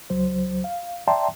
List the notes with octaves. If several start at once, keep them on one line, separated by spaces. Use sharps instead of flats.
C#2 F#3 C5
F5
D5 E5 G5 A5 A#5 C6